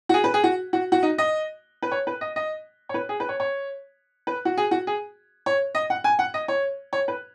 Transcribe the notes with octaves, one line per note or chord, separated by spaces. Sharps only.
F#4
G#4
B4
G#4
F#4
F#4
F#4
D#4
D#5
B4
C#5
B4
D#5
D#5
C#5
B4
G#4
B4
C#5
C#5
B4
F#4
G#4
F#4
G#4
C#5
D#5
F#5
G#5
F#5
D#5
C#5
C#5
B4